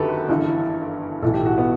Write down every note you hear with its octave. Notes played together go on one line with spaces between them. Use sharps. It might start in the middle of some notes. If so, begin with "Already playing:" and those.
Already playing: G1 F#2 D#3 F#4 G4 A4 B4
G1 G2 E3
B1 A2 E3 A4
G4
F#4
B3